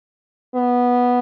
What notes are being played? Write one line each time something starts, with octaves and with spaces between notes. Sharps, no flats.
B3